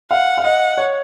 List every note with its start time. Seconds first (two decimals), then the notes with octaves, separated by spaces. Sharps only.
0.11 F5 F#5
0.38 F5
0.44 D#5 F#5
0.78 C#5